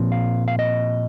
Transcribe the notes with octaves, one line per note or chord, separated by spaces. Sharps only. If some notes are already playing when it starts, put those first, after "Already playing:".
Already playing: A#2 F3 C4
F5
F5
D#5